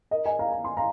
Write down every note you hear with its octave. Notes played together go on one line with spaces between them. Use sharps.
A#4 D#5
D#5 G#5
F5 A#5
A#5
C6
F5 A#5